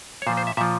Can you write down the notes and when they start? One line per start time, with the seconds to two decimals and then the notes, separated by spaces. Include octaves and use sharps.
0.22 C#5
0.27 A#2 F3 C5
0.37 C5
0.47 E5
0.57 A#2 F3 E5